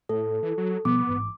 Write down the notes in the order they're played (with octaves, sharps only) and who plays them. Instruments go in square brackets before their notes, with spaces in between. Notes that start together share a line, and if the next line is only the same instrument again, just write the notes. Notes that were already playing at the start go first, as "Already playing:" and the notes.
[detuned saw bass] A2 [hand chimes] A4
[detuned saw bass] E3
F#3
[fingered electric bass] B2 F3 G3 [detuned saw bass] B3 [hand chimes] D6
[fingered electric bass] A1 G#2